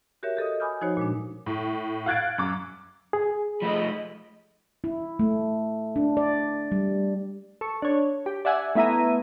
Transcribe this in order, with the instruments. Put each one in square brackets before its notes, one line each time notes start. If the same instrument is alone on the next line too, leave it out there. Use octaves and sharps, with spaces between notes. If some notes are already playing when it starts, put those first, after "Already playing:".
[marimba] F#4 G4 A#4 C#5 E5
G4 A4 D#5 D#6
G#5 B5 D6 D#6 F6 G6
F3 D#4 F#4 C5 C#5
A#2 G#3 D4
[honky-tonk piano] A2
F5 F#5 F#6 G#6 A6 D7
F#2 D6
[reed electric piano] G#4
[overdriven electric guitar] F3 A3 [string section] D#5 B5
[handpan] E4
A3
D4
D5
G3
[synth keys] A4 C#6
D4 C#5
G4
D5 E5 F#5 G#5
A3 B3 E4 E5 A#5 D#7